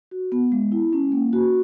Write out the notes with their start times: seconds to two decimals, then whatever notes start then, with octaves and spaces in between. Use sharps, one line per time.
0.11 F#4
0.32 B3
0.52 G#3
0.72 E4
0.93 C#4
1.12 A#3
1.33 F#4